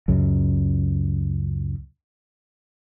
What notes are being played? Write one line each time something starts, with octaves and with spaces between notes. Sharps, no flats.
C#2 F#2